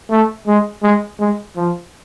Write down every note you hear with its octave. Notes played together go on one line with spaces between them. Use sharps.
A3
G#3
G#3
G#3
F3